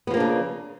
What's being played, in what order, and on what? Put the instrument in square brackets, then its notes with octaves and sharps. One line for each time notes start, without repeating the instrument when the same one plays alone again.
[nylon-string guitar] B3
F3
A#3
D4
C#3